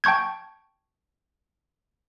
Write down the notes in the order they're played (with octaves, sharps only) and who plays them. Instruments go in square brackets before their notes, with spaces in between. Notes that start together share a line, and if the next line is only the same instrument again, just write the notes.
[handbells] G5 A5 C#6 G6 G#6